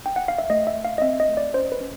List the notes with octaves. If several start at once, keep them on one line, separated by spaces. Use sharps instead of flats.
G5
F#5
F5
E5
A3 D#5
E5
A3
F5
D#5
C4 E5
E5
D#5
A3
D5
C#4 C5
B4
C#4